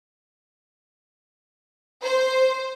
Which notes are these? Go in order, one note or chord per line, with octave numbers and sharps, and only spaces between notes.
C5